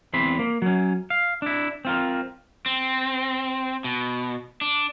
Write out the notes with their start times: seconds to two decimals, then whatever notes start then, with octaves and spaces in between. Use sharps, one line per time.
0.14 E2 C4 B5 C6
0.39 A#3
0.62 F#3 C#4
1.10 F5
1.42 D4 E4
1.85 C4 F4 A#4
2.66 C4
3.84 B2
4.61 D4